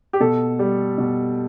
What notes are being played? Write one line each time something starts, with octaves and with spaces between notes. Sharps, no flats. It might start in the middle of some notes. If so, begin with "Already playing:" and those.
G4
B2 A4
G3
B2